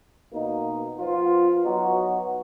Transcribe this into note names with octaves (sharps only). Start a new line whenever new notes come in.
B2 A#3 D#4
F3 B3 F4
F#3 B3 D#4 F#4